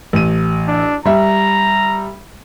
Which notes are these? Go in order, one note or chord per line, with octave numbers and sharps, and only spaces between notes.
A1 D#7
D4
G3 E5 A#5